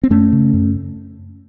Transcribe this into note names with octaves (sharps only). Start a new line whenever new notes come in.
C4
F#2 A3 C#4
C#3
F#2